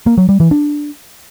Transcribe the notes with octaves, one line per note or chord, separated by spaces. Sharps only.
A#3
F#3
G3
E3
D4